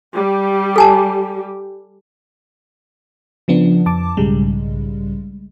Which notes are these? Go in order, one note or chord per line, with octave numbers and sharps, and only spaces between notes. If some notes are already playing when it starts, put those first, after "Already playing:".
G3 G4
A4 G#5 A5
C#3 F3 B3 D4
F2 A5 D6
B1 G#2 C#3 G3 G#3